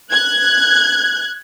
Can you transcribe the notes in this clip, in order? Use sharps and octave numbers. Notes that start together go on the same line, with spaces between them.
F#6 G#6